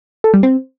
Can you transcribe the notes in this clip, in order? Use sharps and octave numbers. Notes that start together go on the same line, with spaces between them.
A4
G3
C4